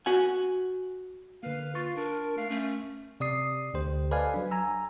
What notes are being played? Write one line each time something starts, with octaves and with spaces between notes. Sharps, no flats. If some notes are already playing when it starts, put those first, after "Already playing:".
F#4 F#5 G#5
D3 A#3 B4 F5
F4 C6 C#6 A6
D4 A#4
A3 F5
A3 C#4
C3 D5 D#6 C7
D2 D3 G4 C5
A4 B4 D5 D#5 F5 G#5
F#3 D4
G#5 A#5 E6